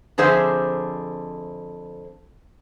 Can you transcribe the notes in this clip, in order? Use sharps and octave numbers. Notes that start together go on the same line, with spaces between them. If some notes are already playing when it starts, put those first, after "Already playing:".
F2 D3 G#4 C5 E5